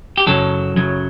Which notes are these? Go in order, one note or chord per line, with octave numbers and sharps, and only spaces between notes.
G4
F#2 C#3 F#3 A4
F#2 C#3 F#3